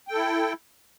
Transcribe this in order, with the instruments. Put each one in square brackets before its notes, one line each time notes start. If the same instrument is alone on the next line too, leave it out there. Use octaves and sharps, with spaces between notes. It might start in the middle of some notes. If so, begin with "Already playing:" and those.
[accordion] G5
A4
E4